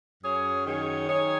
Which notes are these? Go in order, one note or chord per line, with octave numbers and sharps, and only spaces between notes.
F#2 G#4 C#5
D#3 G#4 C#5
D#3 G#4 C#5